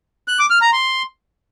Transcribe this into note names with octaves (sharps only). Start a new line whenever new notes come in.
F#6
D6
F6
A#5
C6